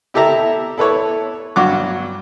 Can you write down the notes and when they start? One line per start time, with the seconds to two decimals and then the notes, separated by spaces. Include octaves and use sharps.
0.14 E4 G4 A4 E5 A#5
0.78 E4 A4 B4 C#5
1.56 G2 F#3 F#5 D6